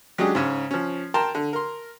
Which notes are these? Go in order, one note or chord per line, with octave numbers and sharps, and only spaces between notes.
F#3 G#3 C#4 D4 G4 G#4
G#2 C#3 C#4
F3 C#4
A#4 G5 A5 A#5 C6
D3
A#4 C6